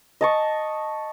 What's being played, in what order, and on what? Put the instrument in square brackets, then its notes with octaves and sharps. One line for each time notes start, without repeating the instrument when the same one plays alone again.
[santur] D#5 A5 C#6